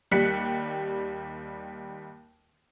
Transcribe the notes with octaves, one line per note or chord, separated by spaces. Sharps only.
D#2 G3 F#6 B6 C#7